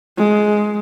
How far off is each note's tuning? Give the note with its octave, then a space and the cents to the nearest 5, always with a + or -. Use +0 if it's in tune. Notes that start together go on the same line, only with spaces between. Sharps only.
G#3 +10